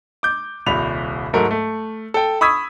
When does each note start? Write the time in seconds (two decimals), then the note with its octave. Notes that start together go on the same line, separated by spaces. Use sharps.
0.23 D6 G6
0.66 D#1 C2 B5 F7
1.33 G#2 F#3 A3 A#4
1.51 A3
2.14 A4 G5
2.41 B5 C#6 D#6 E6 G#6 B6